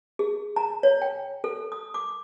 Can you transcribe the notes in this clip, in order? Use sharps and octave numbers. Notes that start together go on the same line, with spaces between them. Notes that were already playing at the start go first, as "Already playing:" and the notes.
G#4
A#5
C#5
G5
A4
D#6
D6